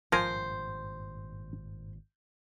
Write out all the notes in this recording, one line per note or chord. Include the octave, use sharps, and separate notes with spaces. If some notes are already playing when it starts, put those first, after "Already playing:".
G#1 G2 A#2 F3 A#4 C5 G#5